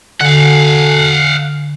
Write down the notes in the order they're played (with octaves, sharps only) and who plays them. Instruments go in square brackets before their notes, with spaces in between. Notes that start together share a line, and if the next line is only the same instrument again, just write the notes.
[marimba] D3 [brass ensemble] F#4 A4 G#5 [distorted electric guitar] F5 F#5